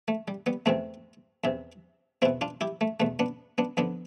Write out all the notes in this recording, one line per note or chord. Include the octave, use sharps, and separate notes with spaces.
A3
G3
G3 B3
E2 C3 E3 A3 C4
E2 C3 E3
E2 B2 C4 E4
D4 F4
E4 G4
A3
E2 B2 A3
B3 D4
B3 D4
F2 D3 B3 D4